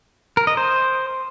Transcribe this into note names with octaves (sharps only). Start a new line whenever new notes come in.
A#4
D#5
C5